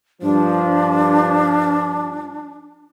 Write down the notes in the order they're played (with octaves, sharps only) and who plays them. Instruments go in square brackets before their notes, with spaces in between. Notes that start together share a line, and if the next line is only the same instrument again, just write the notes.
[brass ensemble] G2 F3 [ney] D4